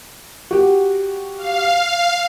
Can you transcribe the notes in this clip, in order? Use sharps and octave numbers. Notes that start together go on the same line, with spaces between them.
F#4 G4
F5